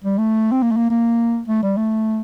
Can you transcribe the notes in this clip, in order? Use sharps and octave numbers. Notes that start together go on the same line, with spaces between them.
G3
A3
C4
A#3
A3
A#3
A#3
A3
G3
A3